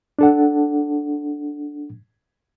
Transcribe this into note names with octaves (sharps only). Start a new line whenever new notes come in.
D4 A4 F#5